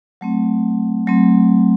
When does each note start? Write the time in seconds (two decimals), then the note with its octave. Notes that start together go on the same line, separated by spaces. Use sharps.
0.21 F#3 A3 C4
1.07 F#3 A3 C4